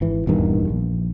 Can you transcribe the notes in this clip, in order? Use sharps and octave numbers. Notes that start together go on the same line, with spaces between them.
G#1 E3
D#1 E2 G2 D#3
A#1